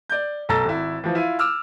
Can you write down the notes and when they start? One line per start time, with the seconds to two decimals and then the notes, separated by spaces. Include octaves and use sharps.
0.10 D5 G6
0.49 B1 A4 A#5 E6 A6
0.65 G#1 E4
1.04 E3 F3
1.15 E4 F4 D#7
1.39 D6 E6 F6